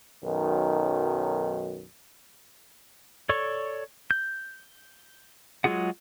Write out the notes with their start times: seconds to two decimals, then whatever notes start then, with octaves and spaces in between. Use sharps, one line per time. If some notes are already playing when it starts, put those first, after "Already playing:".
0.25 B1 F#2 D#3
3.29 A4 C#5 D5 C#6
4.11 G6
5.64 F#3 G#3 F4 G#4 F#5